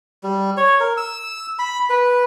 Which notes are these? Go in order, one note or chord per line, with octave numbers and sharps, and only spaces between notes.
G3
C#5
A#4
E6
B5
B4